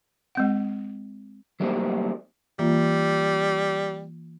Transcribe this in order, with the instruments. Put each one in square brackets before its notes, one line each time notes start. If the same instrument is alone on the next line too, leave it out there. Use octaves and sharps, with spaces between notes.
[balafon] G#3 C4 F#5
[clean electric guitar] F#3 G3 A3 A#3 C4 D#4
[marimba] E3 A#3 F4 [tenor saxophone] G3